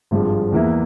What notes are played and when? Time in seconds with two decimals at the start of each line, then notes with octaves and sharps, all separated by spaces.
0.11 G#1 G2 F3 G#3
0.52 E2 E3 A#3 E4